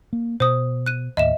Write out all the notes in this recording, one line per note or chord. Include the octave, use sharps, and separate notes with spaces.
A#3
B2 C5 D#6
F#6 D#7
D#2 A2 D#5 E5 E7